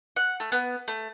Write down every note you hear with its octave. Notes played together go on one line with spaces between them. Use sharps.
F#5
A3
B3
A3